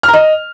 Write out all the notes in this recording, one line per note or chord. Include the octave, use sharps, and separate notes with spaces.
F6
A#5
D#5